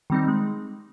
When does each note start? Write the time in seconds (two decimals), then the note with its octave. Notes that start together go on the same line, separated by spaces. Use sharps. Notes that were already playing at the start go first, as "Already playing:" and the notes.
0.10 D#3 G3 C4 D#4
0.28 G#3